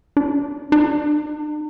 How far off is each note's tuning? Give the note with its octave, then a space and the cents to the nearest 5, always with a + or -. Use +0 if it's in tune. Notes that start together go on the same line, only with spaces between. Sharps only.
D4 +0
D4 +45